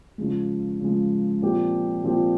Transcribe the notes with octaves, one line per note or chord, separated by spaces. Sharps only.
C#3 F3 G#3
C#3 F3 G#3
A#2 F3 C4 G4
A#2 F3 C4 G4